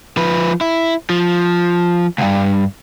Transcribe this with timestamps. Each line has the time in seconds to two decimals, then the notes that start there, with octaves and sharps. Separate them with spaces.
0.17 F3 B4
0.61 E4
1.10 F3
2.18 C#2 G2